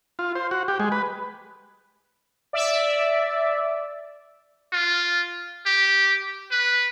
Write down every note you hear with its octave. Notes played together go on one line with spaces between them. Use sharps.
F4
C5
F#4
G4
G#3
B4
D5 E5
F4
G4
B4